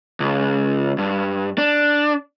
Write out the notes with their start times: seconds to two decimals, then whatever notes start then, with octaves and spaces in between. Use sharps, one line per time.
0.20 C#2
0.98 G2
1.58 D4